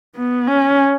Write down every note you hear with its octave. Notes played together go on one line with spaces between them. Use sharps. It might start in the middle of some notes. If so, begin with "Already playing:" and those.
B3
C#4